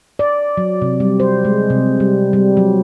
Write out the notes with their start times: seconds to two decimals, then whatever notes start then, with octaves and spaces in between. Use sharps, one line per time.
0.19 D5
0.57 F#3
0.82 C3
1.00 G3
1.20 C5
1.45 G#3
1.70 C3
2.00 G3
2.33 G3
2.57 F#3